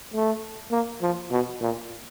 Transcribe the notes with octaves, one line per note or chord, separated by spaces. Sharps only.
A3
A#3
F3
B2
A#2